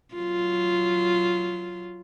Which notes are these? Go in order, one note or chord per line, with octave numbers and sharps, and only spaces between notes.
F#3 F4